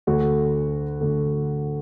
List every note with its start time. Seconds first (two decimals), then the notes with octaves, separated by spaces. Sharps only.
0.07 D2 D3 F#4 A4
1.01 D2 D3